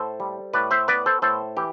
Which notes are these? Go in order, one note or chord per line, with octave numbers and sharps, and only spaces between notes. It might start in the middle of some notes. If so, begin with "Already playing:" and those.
Already playing: A2 A4 C5
G3
A2 B4 D5
C5 E5
B3 B4 D5
A4 C5
A2 A4 C5
E3 G4